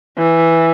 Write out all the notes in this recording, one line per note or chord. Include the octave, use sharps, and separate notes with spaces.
E3